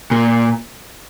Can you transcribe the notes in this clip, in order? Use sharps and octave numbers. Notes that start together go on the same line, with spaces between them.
A#2